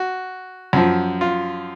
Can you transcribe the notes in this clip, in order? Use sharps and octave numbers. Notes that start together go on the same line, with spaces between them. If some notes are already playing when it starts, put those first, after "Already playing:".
Already playing: F#4
F#2 F3
F4